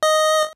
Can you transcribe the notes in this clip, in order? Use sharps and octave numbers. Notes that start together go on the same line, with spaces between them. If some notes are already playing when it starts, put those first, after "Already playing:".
D#5